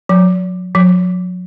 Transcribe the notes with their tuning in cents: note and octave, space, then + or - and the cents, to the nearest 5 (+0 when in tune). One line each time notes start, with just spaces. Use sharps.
F#3 -35
F#3 -40